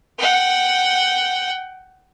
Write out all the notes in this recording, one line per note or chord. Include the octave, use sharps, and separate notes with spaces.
F#5 G5